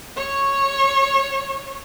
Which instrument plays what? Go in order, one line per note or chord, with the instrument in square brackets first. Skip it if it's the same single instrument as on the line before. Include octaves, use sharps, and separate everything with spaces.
[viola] C#5 C#6